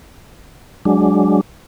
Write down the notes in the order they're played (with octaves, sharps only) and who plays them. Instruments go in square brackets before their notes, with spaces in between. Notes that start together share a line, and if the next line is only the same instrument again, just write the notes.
[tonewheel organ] F#3 G#3 D4